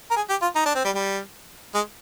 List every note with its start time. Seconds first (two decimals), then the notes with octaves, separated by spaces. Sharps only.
0.11 A#4
0.16 G#4
0.29 G4
0.42 F4
0.55 D#4
0.65 D4
0.75 C4
0.85 G3
0.95 G3
1.74 G#3